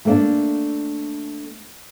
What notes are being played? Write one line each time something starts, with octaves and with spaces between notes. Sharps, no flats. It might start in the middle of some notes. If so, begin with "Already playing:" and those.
A3 A#3 D4